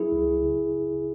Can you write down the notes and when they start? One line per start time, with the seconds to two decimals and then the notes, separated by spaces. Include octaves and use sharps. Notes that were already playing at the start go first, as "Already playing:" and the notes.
Already playing: F#3 E4 G#4
0.12 C#2
0.42 C#3